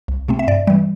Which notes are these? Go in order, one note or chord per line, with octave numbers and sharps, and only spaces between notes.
C2
C3 A3 C4
E5
G2 D5
E3 G3